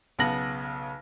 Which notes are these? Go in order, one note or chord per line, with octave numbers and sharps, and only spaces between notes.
B1 C#3 B3 A5 A#6 F#7